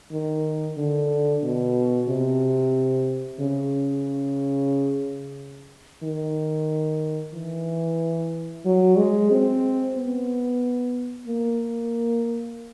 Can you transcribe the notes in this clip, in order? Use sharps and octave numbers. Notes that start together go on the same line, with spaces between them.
D#3
D3
B2
C3
C#3
D#3
E3
F#3
G#3
C4
B3
A#3